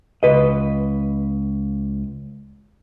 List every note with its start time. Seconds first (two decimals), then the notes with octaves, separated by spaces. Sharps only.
0.23 C#2 B4 D#5